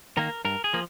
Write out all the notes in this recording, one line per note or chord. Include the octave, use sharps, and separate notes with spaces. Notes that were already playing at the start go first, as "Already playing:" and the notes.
D#3 A#3 A#4
G2 A#4
G#4
F3 A#3